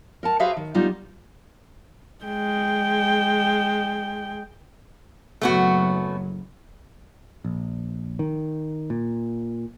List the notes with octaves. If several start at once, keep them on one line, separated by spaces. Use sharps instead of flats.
A#4 F#5 A5
F#4 G#4 B4 C5 E5 F5
D#3
G3 B3 D#4 F4
G#3 G5
F#1 A2 F#3 A3 B3 F#4
A#1
D#3
A#2